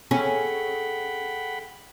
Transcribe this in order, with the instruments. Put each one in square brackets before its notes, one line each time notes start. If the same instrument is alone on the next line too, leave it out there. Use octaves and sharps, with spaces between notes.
[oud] C#4 [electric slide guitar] G#4 A4 [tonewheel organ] F#5 G5 B5